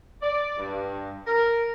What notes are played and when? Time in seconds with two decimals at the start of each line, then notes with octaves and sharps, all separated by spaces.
0.22 D5
0.57 G2
1.27 A#4